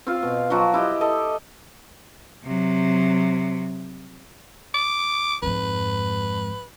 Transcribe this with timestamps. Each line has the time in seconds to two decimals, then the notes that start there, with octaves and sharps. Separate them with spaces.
0.07 C4 F4 F5
0.23 B2
0.50 F3 F#3 F#4
0.74 E4 G4 D#5
1.01 A4 D#5
2.45 C3 F#3
4.74 D6
5.43 F2 G#2 B4